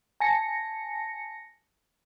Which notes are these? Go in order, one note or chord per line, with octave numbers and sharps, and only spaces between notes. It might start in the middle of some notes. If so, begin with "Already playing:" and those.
G#5 A5 A#6 C#7